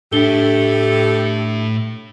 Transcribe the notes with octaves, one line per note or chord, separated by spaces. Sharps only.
A2 D4 E4 G4 A4 G7